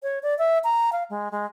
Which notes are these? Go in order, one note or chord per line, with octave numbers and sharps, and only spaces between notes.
C#5
D5
E5
A#5
F5
G#3
G#3